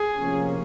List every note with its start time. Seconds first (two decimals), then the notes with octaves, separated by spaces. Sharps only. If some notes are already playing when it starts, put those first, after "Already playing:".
Already playing: G#4
0.18 C3 F3 A#3 C#4